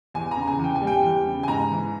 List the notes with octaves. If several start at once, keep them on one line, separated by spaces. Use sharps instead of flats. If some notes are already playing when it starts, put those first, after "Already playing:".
E2 G#5
A#5
C#3
G#5
E2
G5
G#5
G3
G5
E2
C#3
G#5
G#2 A#5
E3